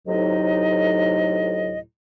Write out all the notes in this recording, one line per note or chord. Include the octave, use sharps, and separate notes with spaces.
D2 A2 C3 F#3 D#4 D#5